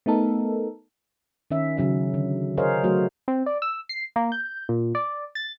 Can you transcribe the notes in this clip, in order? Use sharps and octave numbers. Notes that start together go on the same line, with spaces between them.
A3 B3 D#4 A4 A#4
D#3 C#4 E5
C#3 F#3 E5
D3
G#4 A#4 C5 C#5 D#5 F5
F#3 A3 F#4
C4
D5
E6
C7
A#3
G6
A#2
D5
A6